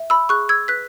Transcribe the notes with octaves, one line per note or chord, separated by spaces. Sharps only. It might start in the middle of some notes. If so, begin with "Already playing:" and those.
Already playing: E5
B5 E6
G#4 C#6 F#6
E6 G#6
B4 F#6 B6